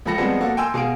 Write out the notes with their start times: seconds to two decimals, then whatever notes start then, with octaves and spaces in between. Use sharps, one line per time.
0.06 C#2 F3 A4 B5 A#6 C#7
0.18 F3 G3 G#3 B3 C4
0.41 A#3 F#4 A4
0.57 G5 G#5 C6 E6
0.74 B2 G#4 F5 D7